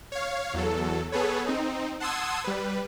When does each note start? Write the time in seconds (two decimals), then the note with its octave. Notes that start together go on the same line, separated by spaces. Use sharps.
0.12 C#5 F5
0.54 E2 F#3 A4
1.12 B3 G#4 A4 B4 C#5
1.46 C4 D#4
2.00 F#5 A5 C6 D#6 E6 G#6
2.44 G3 B4